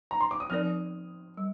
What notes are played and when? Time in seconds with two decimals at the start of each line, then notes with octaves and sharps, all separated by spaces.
0.11 A#5
0.21 C6
0.31 D6
0.40 D#6
0.50 F3 C4 D#4 A#4 D5 F6
1.37 G3